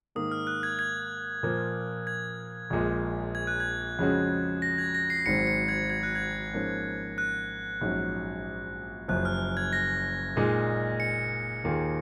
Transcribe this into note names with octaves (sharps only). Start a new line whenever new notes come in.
G#2 D#3 A#3 D#6
F6
F#6
G#6
G#6
A#2 F3 A#3
G#6
A#1 A#2 G#3
G#6
F#6
G#6
F2 C#3 G#3 C#4 F#4
A#6
G#6
A#6
C7
G#1 G#2 F#3 C4 C#7
C#7
G#6
G#6
F#6
G#6
G#2 F3 A#3 C#4
F#6
A#1 G#2 F#3 C#4
F#1 F#2 F3 F#6
F6
G#6
A#6
A#2 G#3 D#4 G#4
C#7
D#2 D#3 A#3 F4 G#4